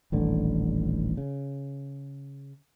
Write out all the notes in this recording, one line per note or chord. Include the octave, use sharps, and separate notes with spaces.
D#1 A1 D3
C#3